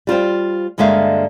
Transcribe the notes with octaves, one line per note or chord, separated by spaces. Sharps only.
G3 F4 C5 G5
G2 D3 G#3 A#3 E5 F5